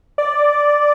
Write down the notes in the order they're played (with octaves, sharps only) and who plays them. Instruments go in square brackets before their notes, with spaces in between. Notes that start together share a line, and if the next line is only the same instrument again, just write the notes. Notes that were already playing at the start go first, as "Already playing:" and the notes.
[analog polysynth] D5